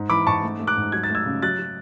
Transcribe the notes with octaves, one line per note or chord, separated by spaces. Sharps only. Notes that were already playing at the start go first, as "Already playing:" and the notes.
Already playing: G#2
E3 B5 D6
G#2 A5 C#6
A3
A3
D6 F#6
G#2
F#3 G#6
A6
A3 E6 G#6
C#3
F#3 F#6 A6
F#3